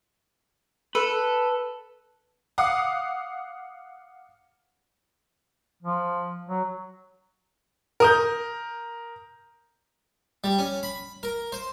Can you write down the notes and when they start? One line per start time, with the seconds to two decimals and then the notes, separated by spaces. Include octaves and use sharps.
0.95 A4 B4
2.58 F5 F#5 D6 D#6
5.83 F3
6.49 F#3
8.00 A#4 D#6 G6
10.44 G3
10.59 C#4
10.83 B5
11.23 A#4
11.52 C5